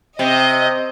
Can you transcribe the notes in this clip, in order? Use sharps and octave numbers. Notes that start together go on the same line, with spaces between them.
C3 D#5